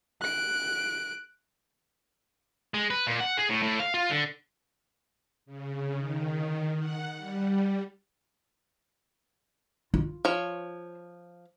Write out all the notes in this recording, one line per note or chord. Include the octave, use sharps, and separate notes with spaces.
F#6 D7
G#3
B4
A#2
F#5
G#4
A2
A2
F5
F4
D3
C#3
D#3
F#5
G3
F4
F3 C#5